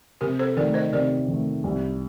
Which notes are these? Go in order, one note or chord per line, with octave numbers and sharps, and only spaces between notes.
C3 G4 A#4
A4 C5
D#3 A3 A#4 D5
C5 D#5
C3 A#4 D5
D#3 A3
C2